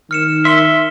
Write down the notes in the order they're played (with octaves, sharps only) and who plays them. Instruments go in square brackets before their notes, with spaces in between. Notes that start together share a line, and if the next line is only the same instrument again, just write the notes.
[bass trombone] D#3 [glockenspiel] F6 C#7 E7
[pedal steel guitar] E5 [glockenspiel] C6 E7 G7